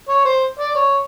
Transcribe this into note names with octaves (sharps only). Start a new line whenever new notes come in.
C#5
C5
D5
C#5